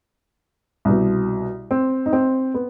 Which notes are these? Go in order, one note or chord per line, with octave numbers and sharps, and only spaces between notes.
C2 B2
C4
D#4
C4
B3